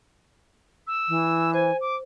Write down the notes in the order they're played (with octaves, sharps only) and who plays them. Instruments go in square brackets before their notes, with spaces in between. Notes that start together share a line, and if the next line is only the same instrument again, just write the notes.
[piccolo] E6
[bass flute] E3
[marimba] C5 [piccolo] G#5
[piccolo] D6